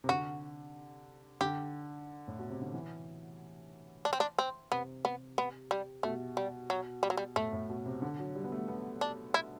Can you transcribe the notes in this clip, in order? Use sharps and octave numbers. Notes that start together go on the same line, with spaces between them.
C3
D3 F#4
D3 G4
A2
B2
C3
D3
E3
D4
C4
D4
C4
C3 B3
B3
B3
G3
B2 A3
G3
F#3
G3
F#3
G3
A2 A3
A2
B2
C3
D3
F#3
G3
B3
A3
B3
D4
E4